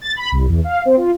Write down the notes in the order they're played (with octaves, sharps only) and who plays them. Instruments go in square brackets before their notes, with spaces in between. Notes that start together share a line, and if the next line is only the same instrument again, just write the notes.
[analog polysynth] A6
B5
C2
E2
F5
C4
F4